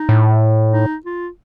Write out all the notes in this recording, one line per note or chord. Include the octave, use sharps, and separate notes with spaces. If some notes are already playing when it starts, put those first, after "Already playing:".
Already playing: D#4
A2
D#4
F4